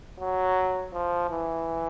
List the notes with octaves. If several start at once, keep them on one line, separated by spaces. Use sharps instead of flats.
F#3
F3
E3